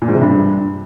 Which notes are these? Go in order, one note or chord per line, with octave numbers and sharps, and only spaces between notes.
A#2
G#2
C3
G2